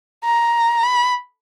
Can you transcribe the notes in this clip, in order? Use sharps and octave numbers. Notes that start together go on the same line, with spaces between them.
A#5
B5